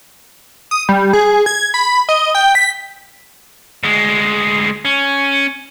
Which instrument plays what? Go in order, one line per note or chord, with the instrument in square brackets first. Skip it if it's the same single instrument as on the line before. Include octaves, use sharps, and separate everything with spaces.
[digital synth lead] D#6
G3
G#4
G#6
B5
D#5
G5
B6
[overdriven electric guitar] D2 G#3
C#4